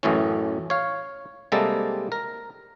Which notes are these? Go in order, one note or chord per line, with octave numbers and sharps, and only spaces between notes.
A1 F#2 A2 E3 C#4
C#5 F5
C3 G3 G#3 A#3 A4
A#4